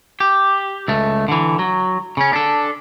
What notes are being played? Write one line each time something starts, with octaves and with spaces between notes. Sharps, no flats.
G4
C#2 A3
D3 E3
F#3
C#3 C#4
D4 A4